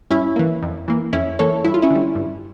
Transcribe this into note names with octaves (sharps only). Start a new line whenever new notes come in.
G2 C#4 E4
E3 A#3
F2
E3 A#3
F2 C#4 E4
E3 A#3 A4 C#5
G2 E4
F4
C#4 E4
D3 G3
G2